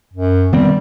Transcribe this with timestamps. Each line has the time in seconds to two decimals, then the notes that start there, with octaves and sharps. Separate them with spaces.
0.13 F#2
0.52 D#3 G3 B3 C4